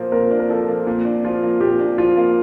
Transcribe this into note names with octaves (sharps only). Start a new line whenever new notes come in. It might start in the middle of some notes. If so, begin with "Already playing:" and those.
Already playing: A#2 F3 A#3 C5
A#2 A#4
D4
A#4
F3 A4
A#3
A#2
D4
F3 F4
A#3
A#2 G4
D4
F3 F4
A#3